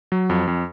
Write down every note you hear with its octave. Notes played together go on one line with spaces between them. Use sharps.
F#3
F2
F2